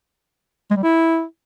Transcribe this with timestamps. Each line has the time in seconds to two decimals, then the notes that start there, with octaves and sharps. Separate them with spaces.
0.70 G#3
0.77 G3
0.83 E4